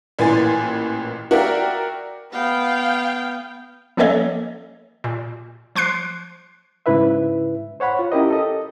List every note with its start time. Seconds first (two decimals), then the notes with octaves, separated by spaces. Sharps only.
0.19 A1 A#2 E3 G#5 C6 A6
1.31 F#4 A#4 D5 E5 F5 G5
2.33 B3 F5 G5
3.97 F3 A#3 C#4 A4 C#5 D#5
5.04 A#2
5.75 F3 C6 F#6 C7
6.86 G#2 C#3 E4 B4 E5
7.80 C5 C#5 F#5 B5
7.99 F4
8.12 C#4 E4 G4 A#4 D#5
8.30 A4 D#5